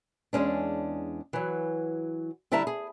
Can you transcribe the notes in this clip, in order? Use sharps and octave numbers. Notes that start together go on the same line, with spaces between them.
E2 G2 G#3 C#4 D4
E3 F#3
D3 G3 E4 E5 A5 A#5
G#4